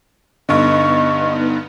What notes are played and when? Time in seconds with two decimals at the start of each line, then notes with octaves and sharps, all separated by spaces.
0.49 G2 D3 B3 D#4 D#5 C#6